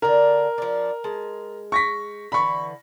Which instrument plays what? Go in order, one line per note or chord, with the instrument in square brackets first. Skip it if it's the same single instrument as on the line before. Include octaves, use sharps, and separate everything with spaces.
[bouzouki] D3 D4 [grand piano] A#4
[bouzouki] F3 D4
G#3 A5
[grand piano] C#6 A#6 B6
[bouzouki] D3 E3 [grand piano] B5 C#6